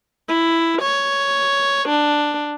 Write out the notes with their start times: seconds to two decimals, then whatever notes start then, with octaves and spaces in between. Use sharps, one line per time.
0.28 E4
0.82 C#5
1.88 D4